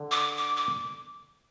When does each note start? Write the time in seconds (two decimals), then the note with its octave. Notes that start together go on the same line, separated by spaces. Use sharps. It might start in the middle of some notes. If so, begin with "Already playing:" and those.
Already playing: D3
0.11 D6
0.37 D6
0.57 D6